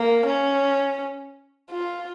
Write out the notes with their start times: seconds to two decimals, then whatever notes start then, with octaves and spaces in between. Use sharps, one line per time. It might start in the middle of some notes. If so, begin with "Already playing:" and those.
Already playing: A#3
0.27 C#4
1.71 F4